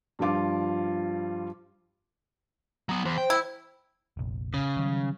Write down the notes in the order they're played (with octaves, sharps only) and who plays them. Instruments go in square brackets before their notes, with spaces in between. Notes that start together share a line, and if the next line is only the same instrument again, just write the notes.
[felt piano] G2 F3 G3 F4 D6
[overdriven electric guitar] F#3 B3
[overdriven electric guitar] E2 [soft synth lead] C5
[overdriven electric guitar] G5
[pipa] E4
[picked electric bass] F1 A#1
[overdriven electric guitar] C#3
[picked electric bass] D#3 F#3 G3